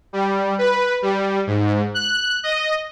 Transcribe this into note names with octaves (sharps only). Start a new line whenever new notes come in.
G3
B4
G3
G#2
F#6
D#5